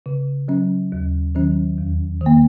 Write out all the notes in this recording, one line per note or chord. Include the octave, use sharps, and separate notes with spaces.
C#3
F#3 C#4
D#2
D#3 F#3 C#4
E2
D#3 A#3